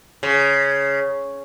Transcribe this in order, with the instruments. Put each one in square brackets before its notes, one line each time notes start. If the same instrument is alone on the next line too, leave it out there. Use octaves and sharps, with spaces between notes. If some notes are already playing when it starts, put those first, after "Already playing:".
[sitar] C#3